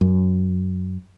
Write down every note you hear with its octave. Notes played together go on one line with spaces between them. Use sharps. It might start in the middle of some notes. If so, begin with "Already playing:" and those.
F#2